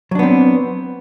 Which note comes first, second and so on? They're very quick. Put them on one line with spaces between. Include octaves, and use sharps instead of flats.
F#3 D4 B3 C4